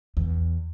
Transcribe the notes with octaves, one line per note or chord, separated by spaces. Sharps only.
E2